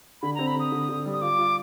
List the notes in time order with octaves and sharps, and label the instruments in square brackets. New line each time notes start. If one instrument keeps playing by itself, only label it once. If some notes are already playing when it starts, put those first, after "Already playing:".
[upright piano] D3 [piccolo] B5
[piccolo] A#5
[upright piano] C4
[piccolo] B5
[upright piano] D3 [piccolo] D#6
[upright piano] D3
D3
G3
[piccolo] D#6
[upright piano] F4 [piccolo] D6
[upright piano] F4